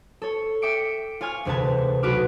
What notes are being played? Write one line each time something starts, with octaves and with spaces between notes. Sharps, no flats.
A4 C#5
E5 G5 D6 C#7 D7
F4 C#5 G#5 F6
E1 D2 C3 B4 A5 G#6
B1 F#4 B4 D6 F6